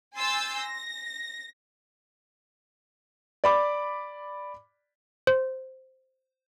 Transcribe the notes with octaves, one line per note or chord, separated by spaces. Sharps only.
G#5 C6 E6 G6 A6
A#6
D5 B5 D6
C5